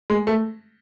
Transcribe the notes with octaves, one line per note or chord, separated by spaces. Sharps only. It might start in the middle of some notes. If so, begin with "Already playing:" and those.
G#3
A3